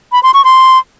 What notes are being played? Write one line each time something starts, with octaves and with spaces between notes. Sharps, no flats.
B5
C6
C#6
C6